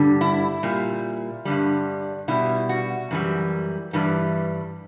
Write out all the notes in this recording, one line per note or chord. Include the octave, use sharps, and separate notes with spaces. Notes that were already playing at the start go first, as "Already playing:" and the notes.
Already playing: G2 D3 G3
E4
A#2 G3
G2 D3 G3
B2 G3 E4
F#4
F#2 E3 G3
G2 E3 G3